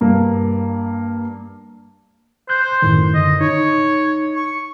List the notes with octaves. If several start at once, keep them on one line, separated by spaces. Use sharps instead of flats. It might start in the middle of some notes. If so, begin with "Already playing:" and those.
G2 A#3
C5 F#6 G6
F#2 A2 D#3
D3 D#5
D#4 C#5
C#6